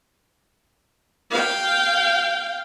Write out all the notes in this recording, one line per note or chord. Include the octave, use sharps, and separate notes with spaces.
F5 G5